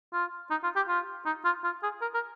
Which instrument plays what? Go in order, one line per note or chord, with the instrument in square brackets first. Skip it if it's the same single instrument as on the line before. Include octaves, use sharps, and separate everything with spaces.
[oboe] F4
D#4
F4
G4
F4
D#4
F4
F4
G#4
A#4
A#4